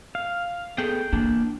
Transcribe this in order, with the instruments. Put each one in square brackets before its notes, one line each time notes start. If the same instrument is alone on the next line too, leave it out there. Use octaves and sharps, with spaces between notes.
[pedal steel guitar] F5
[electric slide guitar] B3 G#4 A4 [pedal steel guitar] G5
[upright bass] E3 [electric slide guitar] A#3 D4